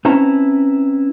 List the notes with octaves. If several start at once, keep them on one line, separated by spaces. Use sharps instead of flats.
C4 C#4 E4 B4 A5 A#5